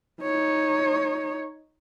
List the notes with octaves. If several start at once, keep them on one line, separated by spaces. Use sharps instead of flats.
D#4 C#5